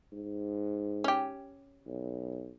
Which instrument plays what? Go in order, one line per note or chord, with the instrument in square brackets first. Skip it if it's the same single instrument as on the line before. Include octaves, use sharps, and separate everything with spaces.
[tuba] G#2
[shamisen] C#4 G4
[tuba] B1